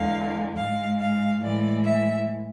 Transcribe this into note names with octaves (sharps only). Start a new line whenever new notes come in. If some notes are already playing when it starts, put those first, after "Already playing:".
Already playing: E2 D3 G#3 F5
G#2 G#3 F5
F5
A2 E3 G#3 D5
E5